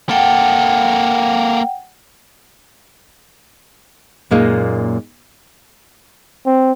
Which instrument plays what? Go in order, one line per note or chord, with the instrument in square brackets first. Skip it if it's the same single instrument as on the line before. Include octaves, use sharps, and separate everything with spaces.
[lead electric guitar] A#3 A4 [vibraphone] F#5 G5
[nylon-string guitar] F#2 A#2 G#3 A#3 D#4
[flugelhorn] C4